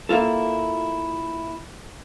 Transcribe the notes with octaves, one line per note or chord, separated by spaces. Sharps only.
A#3 E4 F4 A4